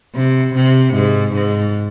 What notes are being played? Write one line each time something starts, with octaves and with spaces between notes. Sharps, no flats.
C3
C3
G#2
G#2